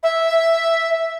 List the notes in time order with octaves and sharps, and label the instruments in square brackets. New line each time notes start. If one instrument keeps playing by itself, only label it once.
[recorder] E5